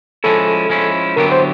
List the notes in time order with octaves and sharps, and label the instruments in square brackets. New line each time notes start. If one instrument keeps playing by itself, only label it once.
[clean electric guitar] F3 G#3 C#4 E4 [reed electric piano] A4
[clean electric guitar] F3 G#3 C#4 E4
[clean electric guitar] D3 F#3 B3 E4 G4 [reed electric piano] A#4
[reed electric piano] C5